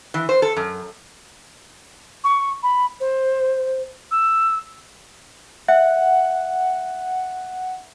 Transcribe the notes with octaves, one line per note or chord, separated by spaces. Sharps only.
E3
C5
A4
F#2
C#6
B5
C5
E6
E5 F#5